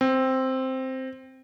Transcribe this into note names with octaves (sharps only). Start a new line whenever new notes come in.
C4